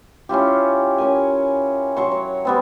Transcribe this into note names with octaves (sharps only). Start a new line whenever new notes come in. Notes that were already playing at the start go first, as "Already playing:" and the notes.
C#4 E4 F4 G4
C#4 A#4 G#5
F#3 C6 C#6
C#5
G3 B3 C4